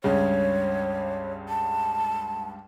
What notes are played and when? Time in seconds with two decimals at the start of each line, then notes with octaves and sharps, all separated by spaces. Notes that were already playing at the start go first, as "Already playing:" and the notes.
0.04 C#2 G2 C#3 C#5
1.49 A5